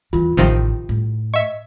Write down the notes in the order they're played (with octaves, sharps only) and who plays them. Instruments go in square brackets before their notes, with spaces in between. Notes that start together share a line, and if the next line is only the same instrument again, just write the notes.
[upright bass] E2 E3 [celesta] F4
[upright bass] A1 [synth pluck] C3 D#3 F3
[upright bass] A2
[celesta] D#5 [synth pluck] E5 C#6